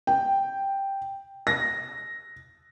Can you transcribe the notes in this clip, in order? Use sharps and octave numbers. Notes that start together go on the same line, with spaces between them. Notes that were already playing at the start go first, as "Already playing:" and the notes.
G5
A#6